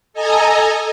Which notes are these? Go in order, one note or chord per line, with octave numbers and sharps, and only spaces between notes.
A4 D#5 G#5 A#5